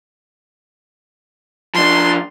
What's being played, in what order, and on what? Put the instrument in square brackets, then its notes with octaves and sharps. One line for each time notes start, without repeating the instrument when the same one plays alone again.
[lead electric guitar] F3 D4 [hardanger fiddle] C6